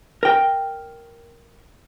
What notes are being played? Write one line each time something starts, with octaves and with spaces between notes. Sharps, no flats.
A#4 G5